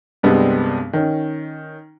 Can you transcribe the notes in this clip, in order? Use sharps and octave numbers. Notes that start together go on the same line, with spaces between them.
C2 G2 G3 G#3 B3 C4
D#3 C#4